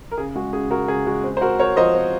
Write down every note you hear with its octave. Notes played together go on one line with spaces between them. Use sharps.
A#4
C#3 G#4
G#3 F#4
C#3 G#4
C#3 F#4 A#4
C#3 G#4
G#3 F#4
C4
C5
C4 F#4 A#4
C4 A#4 C#5
F3 C5 D#5
C4